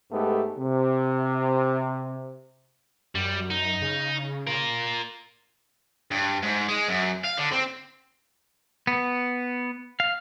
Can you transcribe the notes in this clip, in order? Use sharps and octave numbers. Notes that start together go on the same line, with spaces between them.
G#2 A3 B3 G4
C3
F#2 G3
D#4
C#3
F4 A#4
G2
G#2
G#3
F#2
F5
D3
C4
B3
F5